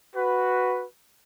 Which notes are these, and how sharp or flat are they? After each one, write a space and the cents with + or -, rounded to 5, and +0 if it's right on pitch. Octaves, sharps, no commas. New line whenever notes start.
F#4 +0 B4 +0